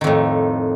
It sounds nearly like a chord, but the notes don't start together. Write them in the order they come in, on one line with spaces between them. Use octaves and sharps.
D#3 F2 A2